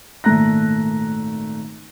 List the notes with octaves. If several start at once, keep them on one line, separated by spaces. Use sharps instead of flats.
G#1 A#2 A3 A#5 F#6 A#6